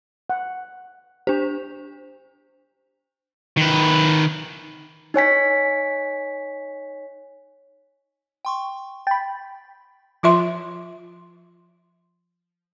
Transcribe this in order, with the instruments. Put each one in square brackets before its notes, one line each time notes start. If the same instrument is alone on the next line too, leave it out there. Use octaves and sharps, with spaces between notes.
[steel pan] F#5
[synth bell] D4 C5 [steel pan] G4
[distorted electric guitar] D#3 B4
[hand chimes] D#4 C#5 G#5 B6
[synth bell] G5 C6 C#6
[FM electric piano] G5 B5 [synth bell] A6
[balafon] F3 F4 E5 C6